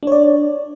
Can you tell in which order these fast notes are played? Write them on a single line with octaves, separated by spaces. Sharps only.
D4 C#5 D5